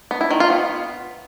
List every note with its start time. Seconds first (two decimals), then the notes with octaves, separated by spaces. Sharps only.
0.11 B3
0.21 E4
0.31 D#3
0.40 F4
0.50 B3